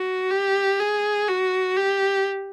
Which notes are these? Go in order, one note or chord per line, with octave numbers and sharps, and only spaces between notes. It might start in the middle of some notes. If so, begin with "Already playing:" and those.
Already playing: F#4
G4
G#4
F#4
G4